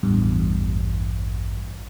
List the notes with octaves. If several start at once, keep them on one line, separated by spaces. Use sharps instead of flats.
A1 E2 G2